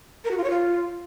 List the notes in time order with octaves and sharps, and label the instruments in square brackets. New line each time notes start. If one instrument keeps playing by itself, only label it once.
[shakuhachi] A#4
F#4
F4
C#5
F4